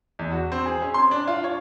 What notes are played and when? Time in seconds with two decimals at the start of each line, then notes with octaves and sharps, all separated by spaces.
0.19 E2
0.32 F#4
0.52 C4
0.66 G#4
0.82 C#4
0.94 C6
1.11 D4
1.28 F4
1.44 C#5